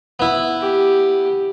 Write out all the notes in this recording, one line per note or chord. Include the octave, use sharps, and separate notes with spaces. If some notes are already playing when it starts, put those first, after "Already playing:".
B3 E4
G4